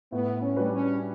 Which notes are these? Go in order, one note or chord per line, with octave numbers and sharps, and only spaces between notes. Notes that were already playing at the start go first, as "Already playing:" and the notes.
A2 B3
C#4
G3 D4 F#4 B4
C#4